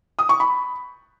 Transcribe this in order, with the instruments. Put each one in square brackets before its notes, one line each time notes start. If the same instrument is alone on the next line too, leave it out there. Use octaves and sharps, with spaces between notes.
[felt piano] D#6
C#6
B5